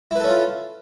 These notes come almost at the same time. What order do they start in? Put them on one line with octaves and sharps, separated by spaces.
E4 B4 A4 C#4 F4